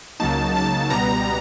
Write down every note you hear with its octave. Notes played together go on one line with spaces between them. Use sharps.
C#2 C#3 F#3 A#3 D#4 A5
A5
C#2 B2 G3 B3 A#5